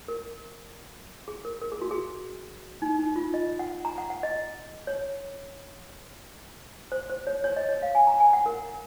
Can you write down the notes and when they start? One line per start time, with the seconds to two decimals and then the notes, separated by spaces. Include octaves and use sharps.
0.08 A#4
1.28 G#4
1.45 A#4
1.62 A#4
1.72 G#4
1.82 F#4
1.91 G#4
2.82 D#4
2.99 D#4
3.16 F4
3.34 D#5
3.59 F#5
3.85 A#5
3.98 F#5
4.10 F#5
4.23 D#5
4.87 C#5
6.92 C5
7.10 C5
7.27 C#5
7.44 C#5
7.57 D#5
7.69 C#5
7.83 F5
7.95 G#5
8.07 A#5
8.20 G#5
8.33 F#5
8.46 A#4